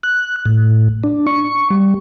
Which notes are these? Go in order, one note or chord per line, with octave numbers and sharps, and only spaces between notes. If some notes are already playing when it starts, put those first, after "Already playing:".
F#6
A2
D4
C#6
G3